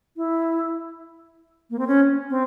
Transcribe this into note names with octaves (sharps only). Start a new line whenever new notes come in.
E4
A#3
C4
C#4
C4